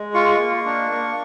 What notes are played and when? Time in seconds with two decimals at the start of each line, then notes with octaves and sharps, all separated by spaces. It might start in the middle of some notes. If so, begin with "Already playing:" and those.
Already playing: G#3
0.14 F4 C#6
0.39 A#3
0.66 D4
0.91 A#3